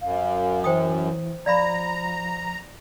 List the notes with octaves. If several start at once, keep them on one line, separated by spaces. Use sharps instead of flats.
F#2 F5
E3 C5 G5 D#6
F3 D5 F5 A#5 B5